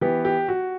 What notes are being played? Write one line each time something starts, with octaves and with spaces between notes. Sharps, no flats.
E3 B3 G4
G4
F#4